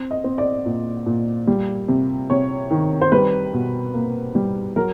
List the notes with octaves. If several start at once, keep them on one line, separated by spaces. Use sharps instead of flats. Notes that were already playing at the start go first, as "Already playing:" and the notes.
Already playing: C4
D#5
C4
D5
A#2
A#2
G3
C3
C3 C#5
D#3
C5
G3 B4
B2
A#3
G3
F#3 A#4